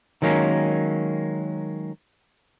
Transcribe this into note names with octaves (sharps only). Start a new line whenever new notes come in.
D#3 F#3 G#3 A#3 C#4